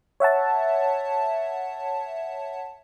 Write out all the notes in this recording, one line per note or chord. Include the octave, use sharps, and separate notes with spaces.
C#5 E5 F#5 A5